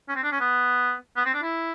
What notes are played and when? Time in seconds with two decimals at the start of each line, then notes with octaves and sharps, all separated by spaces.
0.09 C#4
0.16 C4
0.23 D4
0.32 C#4
0.40 B3
1.16 B3
1.25 C4
1.34 D4
1.42 E4